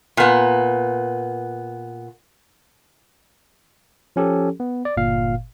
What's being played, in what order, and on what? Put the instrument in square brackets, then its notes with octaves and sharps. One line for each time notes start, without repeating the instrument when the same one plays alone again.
[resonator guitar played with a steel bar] A#2 B3
[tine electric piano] F3 C#4 G4 A4
B3
D5
G1 A#2 F5